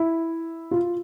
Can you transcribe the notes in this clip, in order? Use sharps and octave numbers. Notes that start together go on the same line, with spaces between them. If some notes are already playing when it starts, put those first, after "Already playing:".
Already playing: E4
F4